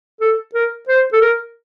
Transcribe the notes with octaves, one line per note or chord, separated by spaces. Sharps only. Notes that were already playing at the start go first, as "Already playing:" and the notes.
A4
A#4
C5
A4
A#4